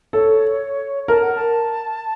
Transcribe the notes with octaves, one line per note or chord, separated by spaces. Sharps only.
A4 C#5
A#4 A5
F#5
A5